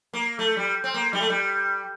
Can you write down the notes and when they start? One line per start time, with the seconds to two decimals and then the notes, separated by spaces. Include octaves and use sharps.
0.13 A#3
0.39 A3
0.57 G3
0.84 C4
0.94 A#3
1.13 G3
1.21 A3
1.30 G3